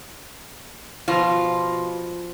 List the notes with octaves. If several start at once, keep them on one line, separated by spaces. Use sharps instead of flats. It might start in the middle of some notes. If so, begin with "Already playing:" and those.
B2 F3 F4